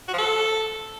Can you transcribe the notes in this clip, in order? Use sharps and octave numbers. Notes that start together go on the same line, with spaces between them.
F#4
F3
A4